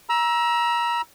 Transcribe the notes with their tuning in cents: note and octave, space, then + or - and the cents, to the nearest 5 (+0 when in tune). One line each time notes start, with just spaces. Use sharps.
A#5 +30 E6 +0